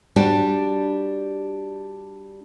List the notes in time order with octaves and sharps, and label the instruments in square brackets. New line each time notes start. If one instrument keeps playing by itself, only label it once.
[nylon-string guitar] G3 D4 F#4 G4 D5